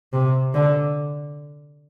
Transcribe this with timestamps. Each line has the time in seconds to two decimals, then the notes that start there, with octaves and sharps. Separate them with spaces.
0.13 C3
0.54 D3